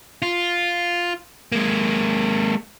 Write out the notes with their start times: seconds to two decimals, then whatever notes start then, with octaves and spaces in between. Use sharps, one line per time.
0.22 F4
1.52 G#3 A#3